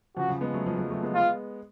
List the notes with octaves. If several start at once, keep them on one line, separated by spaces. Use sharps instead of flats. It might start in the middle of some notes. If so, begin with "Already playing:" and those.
C#3 F3 F#4
C#3 F3
G#3 B3
F#3 A3
F3 G#3
F3 G#3
F#3 A3
G#3 B3
F4